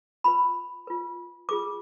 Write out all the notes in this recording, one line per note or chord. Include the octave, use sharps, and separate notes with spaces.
F4 B4 B5
F4 B4
F4 G#4 B4 D6